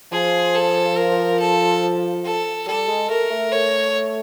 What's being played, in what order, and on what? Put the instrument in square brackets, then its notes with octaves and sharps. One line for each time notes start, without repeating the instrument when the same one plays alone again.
[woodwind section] F3 [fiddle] G#4
[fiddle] A4
A#4
A4
A4
[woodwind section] G3 [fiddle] A4
[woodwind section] G#3
[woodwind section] A3 [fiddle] A#4
[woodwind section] A3
[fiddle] C#5